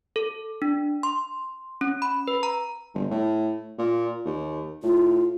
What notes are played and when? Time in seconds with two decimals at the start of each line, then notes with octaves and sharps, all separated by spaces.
0.16 A4
0.62 D4
1.03 C6
1.81 C#4
2.02 B5
2.28 B4
2.43 A#5
2.94 G1
3.11 A2
3.78 A#2
4.25 D#2
4.83 A2 F4